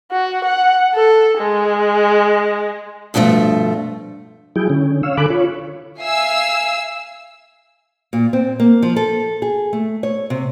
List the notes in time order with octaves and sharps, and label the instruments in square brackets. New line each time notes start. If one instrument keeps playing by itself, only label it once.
[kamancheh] F#4
F#5
A4
G#3
[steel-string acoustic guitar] G2 B2 F3 G3 A3
[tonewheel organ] F#3 E4 G#4 G5
D3 C#4
C#5 F5 E6
D3 A4 G#5 B5 D6 F#6
F4 C#5
[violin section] E5 F5 G#5 E6 C7
[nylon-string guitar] A#2
C4
A#3
F3
A4
G#4
A3
C#5
C3